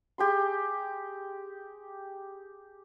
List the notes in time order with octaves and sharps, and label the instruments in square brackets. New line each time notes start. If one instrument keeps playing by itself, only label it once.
[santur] G4 G#4 C6